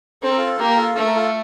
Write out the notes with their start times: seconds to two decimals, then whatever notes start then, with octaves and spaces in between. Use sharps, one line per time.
0.23 C4 A4
0.29 A#4
0.37 F4 A4
0.59 A#3 G4
0.70 A#4
0.77 F4 A4
0.95 A3 A4
1.06 A#4
1.16 F4 A4